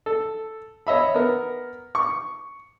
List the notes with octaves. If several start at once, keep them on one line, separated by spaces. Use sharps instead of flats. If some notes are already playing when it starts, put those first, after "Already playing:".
A4
C#5 D#5 E5 B5
B3 A#4
C#6